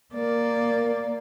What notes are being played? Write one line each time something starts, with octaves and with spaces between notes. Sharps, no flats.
A#3 A#4 D5